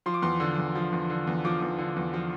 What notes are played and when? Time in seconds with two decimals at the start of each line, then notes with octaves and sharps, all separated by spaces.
0.06 F3 C6
0.14 D6
0.22 E2 C6
0.40 D3
0.58 E2
0.75 F3
0.93 E2
1.10 D3
1.27 E2
1.44 F3 D6
1.62 E2
1.78 D3
1.96 E2
2.13 F3